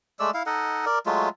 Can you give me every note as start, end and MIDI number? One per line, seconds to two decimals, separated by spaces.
0.20 0.31 56
0.20 0.31 57
0.20 0.31 74
0.20 0.31 88
0.34 0.43 64
0.34 0.43 77
0.46 0.85 63
0.46 0.85 69
0.46 0.85 75
0.46 0.85 78
0.86 0.99 70
0.86 0.99 74
1.06 1.29 54
1.06 1.29 56
1.06 1.29 57
1.06 1.29 65